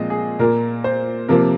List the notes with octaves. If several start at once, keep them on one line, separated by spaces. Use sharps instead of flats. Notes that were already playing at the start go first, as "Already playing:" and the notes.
Already playing: A#2 F3 G#3 C4 D#5
G#4
A#2 A#3 A#4
C5
C3 F3 A#3 A#4